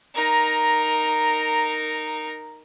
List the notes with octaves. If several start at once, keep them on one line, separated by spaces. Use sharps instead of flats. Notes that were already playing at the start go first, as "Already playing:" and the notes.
D#4 A#4